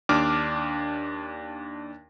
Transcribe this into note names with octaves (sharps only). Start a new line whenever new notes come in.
D#2 D4 D6 F6